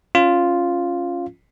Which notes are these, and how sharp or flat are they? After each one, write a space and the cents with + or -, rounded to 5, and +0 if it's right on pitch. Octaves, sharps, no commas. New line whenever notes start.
C#4 +0 F4 +0